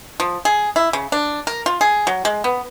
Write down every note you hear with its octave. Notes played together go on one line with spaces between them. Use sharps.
F3
G#4
E4
C#3
D4
A#4
F4
G#4
F#3
G#3
B3